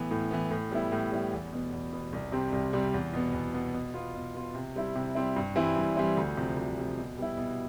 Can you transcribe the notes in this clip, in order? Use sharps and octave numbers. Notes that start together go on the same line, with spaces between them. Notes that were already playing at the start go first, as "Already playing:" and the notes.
Already playing: A2 E3 B3
A2
E3 B3
A2
G3 B3 E4
A2
G3 B3 E4
E2
B2 B3
E2
B2 B3
C2
C3 G3 C4
C2
C3 G3 C4
E2
B2 B3
E2
B2 B3
B2
B3 F4
B2
B3 F4
C3
G3 C4 E4
C3
G3 C4 E4
G2
E3 G3 C4 E4
G2
E3 G3 C4 E4
D2
C3 F3
D2
C3 F3
B2
G3 B3 E4
B2